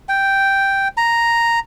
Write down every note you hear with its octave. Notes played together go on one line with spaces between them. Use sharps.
G5
A#5